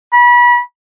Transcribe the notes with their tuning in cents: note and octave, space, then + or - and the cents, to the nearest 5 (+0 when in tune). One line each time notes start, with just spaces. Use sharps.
B5 -30